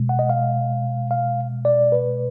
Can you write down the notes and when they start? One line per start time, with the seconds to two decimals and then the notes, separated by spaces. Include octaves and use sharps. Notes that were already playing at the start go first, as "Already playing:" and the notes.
Already playing: B2 G#3
0.09 F#5
0.19 D#5
0.30 F5
1.11 F5
1.65 D5
1.92 B4